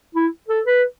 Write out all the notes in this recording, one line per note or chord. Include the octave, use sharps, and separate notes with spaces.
E4
A4
B4